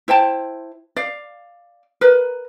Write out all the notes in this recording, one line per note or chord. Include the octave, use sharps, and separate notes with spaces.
E4 C5 G5 A5
D5 F5
A#4 B4